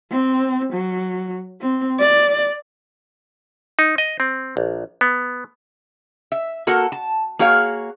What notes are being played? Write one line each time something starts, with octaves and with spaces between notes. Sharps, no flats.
C4
F#3
C4
D5
D#4
D#5
C4
A#1
B3
E5
A#3 F#4 A4 A#4 F#5
A5
A#3 F#4 G#4 C#5 F5